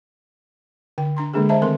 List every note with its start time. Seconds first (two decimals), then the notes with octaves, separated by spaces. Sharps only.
0.98 D3 G5
1.17 D4 A#5 C6
1.34 D3 G#3 A#3 D4 G#4 A4
1.49 C5 D#5 E5 A5 A#5
1.61 D#3 A3 C4 A4 A#4 C6